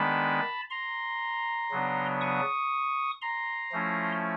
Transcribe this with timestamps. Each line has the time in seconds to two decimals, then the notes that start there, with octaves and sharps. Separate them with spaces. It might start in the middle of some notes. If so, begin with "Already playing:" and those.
Already playing: D#3 G#3 B3 D4 A5 B5
0.70 A#5 C6
1.71 C#3 F#3 B3 D4
2.21 C#6 D#6
3.22 A#5 C6
3.72 F3 A3 C#4 E4